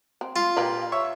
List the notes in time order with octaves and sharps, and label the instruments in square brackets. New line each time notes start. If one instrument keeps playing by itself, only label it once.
[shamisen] C4
[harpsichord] F4
[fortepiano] A#2 G4 [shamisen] A#4 B4 F5
[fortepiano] C#5 E5 C#6